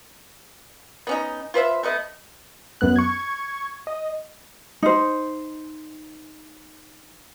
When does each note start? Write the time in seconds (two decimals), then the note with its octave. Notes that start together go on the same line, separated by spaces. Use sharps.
1.07 B3 C#4 D#4
1.54 F4 B4 C5 E5
1.83 A3 B3 D#5
2.81 F#2 B3 F#6
2.96 C#6 G#6
3.87 D#5
4.82 D#4 C5